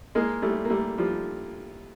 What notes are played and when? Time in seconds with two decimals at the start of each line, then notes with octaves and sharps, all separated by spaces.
0.15 G#3 A#3
0.42 G3 A3
0.65 A#3
0.70 G3 A3
0.98 F3 G3